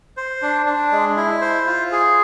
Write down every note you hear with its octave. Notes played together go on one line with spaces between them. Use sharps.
C5
D4
D4
G#3
E4
C5
F4
G#4